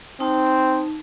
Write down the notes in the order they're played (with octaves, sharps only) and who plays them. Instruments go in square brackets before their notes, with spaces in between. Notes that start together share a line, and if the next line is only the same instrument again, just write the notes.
[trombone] C4 [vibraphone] D#4 A5